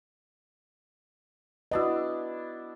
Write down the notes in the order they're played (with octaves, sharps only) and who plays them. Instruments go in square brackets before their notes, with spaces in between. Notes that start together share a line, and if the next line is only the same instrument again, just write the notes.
[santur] B3 D4 E4 [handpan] F#4 D#5